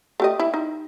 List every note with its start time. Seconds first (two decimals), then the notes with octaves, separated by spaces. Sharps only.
0.20 A3 G4 D#5
0.39 E4
0.54 D#4